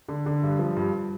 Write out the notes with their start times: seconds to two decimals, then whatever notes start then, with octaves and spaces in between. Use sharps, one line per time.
0.09 D3
0.26 D3
0.43 G2
0.59 F3
0.77 G2